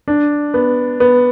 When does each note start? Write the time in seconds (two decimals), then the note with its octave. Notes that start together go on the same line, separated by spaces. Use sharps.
0.08 D4
0.54 B3
1.00 B3